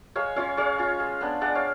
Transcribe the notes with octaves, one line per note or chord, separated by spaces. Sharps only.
G#3 C#5 F5
C#4 F4 C#5 F5
G#3 C#5 F5
C#4 F4
G#3
B3 D4
G#3 D5 F#5
C#5 F5